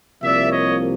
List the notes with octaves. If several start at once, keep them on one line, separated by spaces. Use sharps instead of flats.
C2 C3 F3 A#3 D5 E5
C#5 D#5